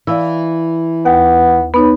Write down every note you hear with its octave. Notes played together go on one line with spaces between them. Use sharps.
E3 D5 F5 E6
D#2 B3 G5
B3 D#4 B4 C#5